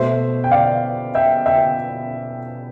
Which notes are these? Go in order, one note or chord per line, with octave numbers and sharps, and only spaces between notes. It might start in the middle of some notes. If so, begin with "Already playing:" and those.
Already playing: B2 A3 C5 E5
G5
D5 F5
E5 G5
E5 G5